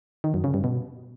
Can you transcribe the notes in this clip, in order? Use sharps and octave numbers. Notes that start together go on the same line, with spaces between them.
D#3
F#2
C#3
G2
B2